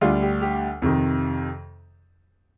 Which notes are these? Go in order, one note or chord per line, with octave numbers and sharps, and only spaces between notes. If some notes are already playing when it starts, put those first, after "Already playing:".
D2 D3 G3 F4
G4
G4
F2 C3 D#3